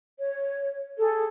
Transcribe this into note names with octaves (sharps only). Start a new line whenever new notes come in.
C#5
G#4 A4